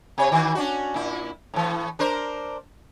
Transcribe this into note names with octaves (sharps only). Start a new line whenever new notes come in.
C3 C#5
D#3 E3 F#4
C#4 D4 F#4
A#2 E4
A2 E3
D4 A#4 C5